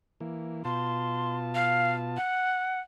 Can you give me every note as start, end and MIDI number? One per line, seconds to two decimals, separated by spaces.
0.20 0.63 52
0.20 0.63 58
0.65 2.18 47
0.65 2.18 65
0.65 2.18 81
0.65 1.36 84
1.55 1.93 77
2.17 2.80 78